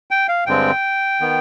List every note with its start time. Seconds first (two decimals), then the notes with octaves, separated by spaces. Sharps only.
0.11 G5
0.28 F5
0.46 G2 D3 G#3 C4 G5
1.21 D#3 B3